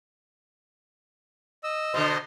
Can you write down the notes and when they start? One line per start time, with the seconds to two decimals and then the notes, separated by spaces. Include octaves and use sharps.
1.64 D#5 E6
1.94 B2 D3 C5 D#5 C6